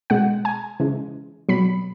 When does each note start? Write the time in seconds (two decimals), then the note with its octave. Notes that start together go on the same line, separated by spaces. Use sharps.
0.10 B2 G#3 F#5
0.45 G#5
0.80 C#3 E3 G#3
1.49 B2 F#3 B5